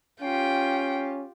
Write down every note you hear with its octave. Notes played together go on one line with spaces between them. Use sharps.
C#4 F4 G4 G5